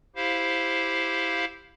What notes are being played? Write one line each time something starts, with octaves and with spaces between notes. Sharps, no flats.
E4 G4 C5 F5